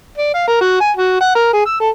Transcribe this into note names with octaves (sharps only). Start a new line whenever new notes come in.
D5
F5
A#4
F#4
G#5
F#4
F#5
A#4
G#4
E6
A4